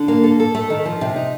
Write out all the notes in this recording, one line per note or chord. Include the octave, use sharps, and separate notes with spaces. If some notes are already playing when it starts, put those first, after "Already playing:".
Already playing: D3
A#3
A4
A4
A3
D#3
F3
C3
D#4